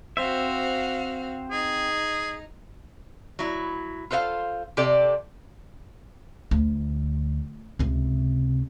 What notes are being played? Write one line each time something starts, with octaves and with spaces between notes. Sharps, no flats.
C4 F#4 C5 E5 F5
D#4 G#4
F#3 E4
F4 A4 C5 D5 F5
C3 G4 A4 D5
D2
C#2 C3